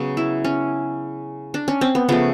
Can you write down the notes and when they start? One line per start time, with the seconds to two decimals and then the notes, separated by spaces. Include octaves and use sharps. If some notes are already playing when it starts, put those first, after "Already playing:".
Already playing: C#3 F#3 B3
0.17 E4
0.44 C#4
1.54 D4
1.68 C#4
1.81 C4
1.95 B3
2.09 C#3 F3 A3 B3